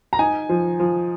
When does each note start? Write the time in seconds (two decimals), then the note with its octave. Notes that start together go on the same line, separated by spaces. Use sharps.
0.13 A#5
0.19 D#4 G#5
0.49 F3
0.80 F3